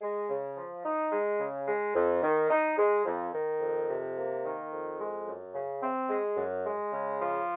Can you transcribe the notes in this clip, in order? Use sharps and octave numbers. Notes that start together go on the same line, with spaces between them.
G#3
C#3
F3
D#4
G#3
C#3
G#3
F2
D#3
D#4
G#3
F2
D#3
F2
C3
A#3
D#3
F2
G#3
F#2
C#3
C4
G#3
F#2
G#3
C#3
F3